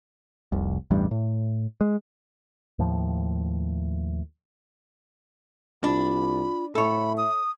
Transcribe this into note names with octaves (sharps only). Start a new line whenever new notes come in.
F1 C2
A1 E2 G2 G3
A2
G#3
D#2 A2 F3
C2 D4 F4 B5
A2 A4 C#5 E5 B5
D#6